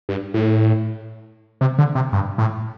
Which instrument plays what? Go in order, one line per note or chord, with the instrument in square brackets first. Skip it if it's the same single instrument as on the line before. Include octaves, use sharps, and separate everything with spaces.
[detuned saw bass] G2
A2
C3
D3
C3
G2
A2